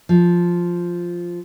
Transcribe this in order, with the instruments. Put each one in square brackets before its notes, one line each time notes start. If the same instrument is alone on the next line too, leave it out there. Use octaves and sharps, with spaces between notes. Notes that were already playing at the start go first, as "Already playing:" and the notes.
[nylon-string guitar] F3